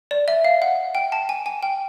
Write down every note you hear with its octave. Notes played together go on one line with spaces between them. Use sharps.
D5
E5
F5
F#5
G5
A5
G#5
G#5
G5